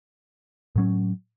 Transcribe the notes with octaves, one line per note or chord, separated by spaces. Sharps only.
A2 F#3 C#4